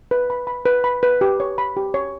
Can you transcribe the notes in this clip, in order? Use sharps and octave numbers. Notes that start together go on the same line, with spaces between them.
B4
B5
B5
B4
B5
B4
G4
C#5
B5
G4
C#5